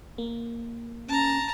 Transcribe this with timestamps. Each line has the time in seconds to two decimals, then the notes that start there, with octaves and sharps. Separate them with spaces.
0.18 A#3
1.08 C#4 A5 A#5